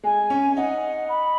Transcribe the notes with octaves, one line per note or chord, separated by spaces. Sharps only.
G#3 G#5
C#4
D#4 F#5
B5